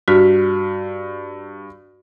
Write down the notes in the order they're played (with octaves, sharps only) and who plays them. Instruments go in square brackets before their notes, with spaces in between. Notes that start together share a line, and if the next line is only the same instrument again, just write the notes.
[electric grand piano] G2 F6 B6 [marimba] F#4